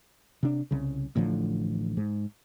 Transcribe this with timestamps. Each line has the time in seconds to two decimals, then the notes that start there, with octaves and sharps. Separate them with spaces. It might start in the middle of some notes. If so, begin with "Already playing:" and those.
0.43 C3 D4
0.71 C2 C#3
1.16 A1 A2 D3 F3
1.97 G#2